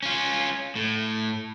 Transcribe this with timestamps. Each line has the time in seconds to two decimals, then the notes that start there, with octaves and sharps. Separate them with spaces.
0.02 C#4 F4
0.75 A2